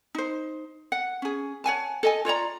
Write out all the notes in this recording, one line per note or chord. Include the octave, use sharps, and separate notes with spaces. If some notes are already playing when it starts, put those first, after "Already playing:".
D#4 C5
F#5
C#4 G#4
C#5 F#5 G#5 A5
A4 D#5 G#5
F4 C#5 D5 A#5